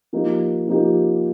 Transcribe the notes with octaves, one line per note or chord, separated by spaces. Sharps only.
F3 A#3 D#4 G4
F3 A#3 D#4 G4